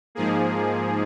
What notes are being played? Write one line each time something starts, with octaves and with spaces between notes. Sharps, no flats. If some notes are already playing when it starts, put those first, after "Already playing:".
G#2 F3 A#3 G#4